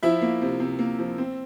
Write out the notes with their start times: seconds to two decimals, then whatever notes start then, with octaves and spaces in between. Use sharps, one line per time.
0.03 F3 E4 E5
0.22 A#3
0.42 C3
0.60 C3
0.79 A#3
0.99 F3
1.18 C4